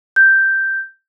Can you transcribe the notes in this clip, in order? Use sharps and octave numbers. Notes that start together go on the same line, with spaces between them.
G6